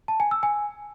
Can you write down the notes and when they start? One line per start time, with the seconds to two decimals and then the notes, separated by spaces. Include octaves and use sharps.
0.08 A5
0.20 G#5
0.31 E6
0.43 G#5